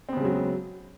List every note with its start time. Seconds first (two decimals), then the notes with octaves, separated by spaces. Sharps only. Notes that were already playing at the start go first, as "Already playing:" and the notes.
0.09 C4
0.13 B3
0.17 C#3
0.21 G#3
0.25 F#3